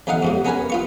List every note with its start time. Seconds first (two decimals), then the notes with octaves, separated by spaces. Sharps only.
0.07 B1 E3 D#4 F5 F#5
0.22 F2 G#2 C3
0.45 B3 C#4 A#4 B4 G#5
0.70 B3 F4 C#6